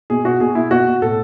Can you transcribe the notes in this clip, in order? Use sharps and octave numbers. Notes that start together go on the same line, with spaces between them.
B2 G#4
B2 F#4
B2 G#4
B2 E4
B2 F#4
B2
A2 A4